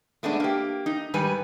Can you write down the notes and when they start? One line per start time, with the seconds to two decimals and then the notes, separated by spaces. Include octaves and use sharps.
0.23 G#3 A3 B3 D4
0.40 A#3 G4
0.86 D#4
1.14 G#2 D#3 G3 B4 G#5